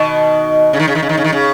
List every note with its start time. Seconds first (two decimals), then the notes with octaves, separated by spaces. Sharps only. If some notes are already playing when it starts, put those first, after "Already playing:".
Already playing: B2 D#3
0.73 C#3
0.80 D#3
0.88 C#3
0.95 D#3
1.03 C#3
1.09 D#3
1.17 C#3
1.24 D#3
1.32 C#3